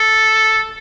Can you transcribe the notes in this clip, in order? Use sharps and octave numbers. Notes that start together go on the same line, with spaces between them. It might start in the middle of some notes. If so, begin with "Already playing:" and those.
Already playing: A4